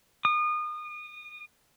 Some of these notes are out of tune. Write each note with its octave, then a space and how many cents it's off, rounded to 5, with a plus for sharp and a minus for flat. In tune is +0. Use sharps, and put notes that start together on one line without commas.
D#6 -30